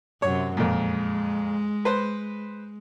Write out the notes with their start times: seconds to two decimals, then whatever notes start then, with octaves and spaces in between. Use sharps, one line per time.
0.22 F#2 C3 C#5
0.57 F2 A#2 G#3
1.85 B4 C5